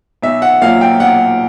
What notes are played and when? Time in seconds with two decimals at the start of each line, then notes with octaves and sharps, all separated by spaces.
0.23 B1 E5
0.42 F#5
0.62 A#2 F#3 A#3 F5
0.81 G5
1.00 B1 F#5